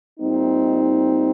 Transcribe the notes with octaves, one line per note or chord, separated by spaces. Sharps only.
A#2 G3 C4 D#4